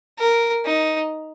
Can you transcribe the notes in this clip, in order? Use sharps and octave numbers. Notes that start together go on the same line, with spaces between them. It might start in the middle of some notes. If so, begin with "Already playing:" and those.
A#4
D#4